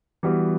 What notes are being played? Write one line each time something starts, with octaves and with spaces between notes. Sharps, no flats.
E3 G3 B3 F#4